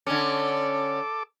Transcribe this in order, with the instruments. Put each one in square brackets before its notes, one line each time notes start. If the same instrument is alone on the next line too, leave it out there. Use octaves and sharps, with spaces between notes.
[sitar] D3 C#4 [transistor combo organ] A4 D6